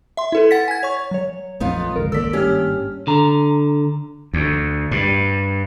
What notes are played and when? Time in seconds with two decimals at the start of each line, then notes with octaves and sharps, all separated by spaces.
0.17 E5 C6
0.32 E4 A4 B4
0.51 F#5 A6 B6
0.68 G#5 G#6
0.83 C#5 C#6
1.11 F#3 C#5
1.60 A#1 F2 B3 D#4 F4
1.96 G1 C#2 A#4
2.12 G#1 A#3 A4 D5 E6 B6
2.33 G2 C#4 G4 F6
3.07 D3 A#5
4.34 D2
4.91 G2